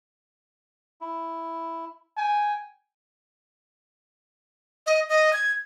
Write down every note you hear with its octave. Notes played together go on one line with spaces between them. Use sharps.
E4
G5 G#5
D#5
D#5
G#6